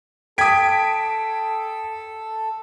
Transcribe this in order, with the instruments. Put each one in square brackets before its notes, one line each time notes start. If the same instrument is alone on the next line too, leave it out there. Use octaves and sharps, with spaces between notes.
[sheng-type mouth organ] A4 [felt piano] G5 D#6 [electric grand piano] G#6 B6 D7